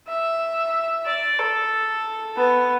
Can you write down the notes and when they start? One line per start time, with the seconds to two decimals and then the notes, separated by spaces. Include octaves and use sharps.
0.08 E5
1.06 D5
1.39 A4
2.37 B3